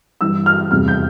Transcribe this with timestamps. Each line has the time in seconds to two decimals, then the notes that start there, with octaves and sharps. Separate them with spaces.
0.21 G2 E3 G3 E6
0.46 F6
0.71 F1 E2 C3 G3 F6
0.88 G6